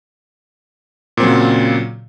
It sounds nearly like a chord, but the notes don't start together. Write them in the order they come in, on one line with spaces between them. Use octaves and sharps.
A#2 C4 F#3 C#3